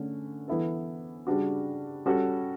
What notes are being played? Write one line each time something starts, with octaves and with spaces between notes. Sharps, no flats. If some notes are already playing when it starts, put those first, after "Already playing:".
Already playing: D3 A3 C#4
E3 B3 E4 A4
C#3 G3 D4 F#4
G3 C#4 F#4 A4